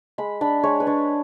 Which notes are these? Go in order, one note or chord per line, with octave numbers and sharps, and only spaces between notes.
G#3 B5
D4 B5
G#3 C#5
B4
D4 C#5